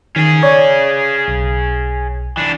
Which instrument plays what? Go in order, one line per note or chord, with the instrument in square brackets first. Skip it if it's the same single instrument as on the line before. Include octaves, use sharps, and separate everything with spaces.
[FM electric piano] D#3 [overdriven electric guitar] C#4 G#4
[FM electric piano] C#5 D5 G#6
B1
[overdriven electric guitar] E3 D4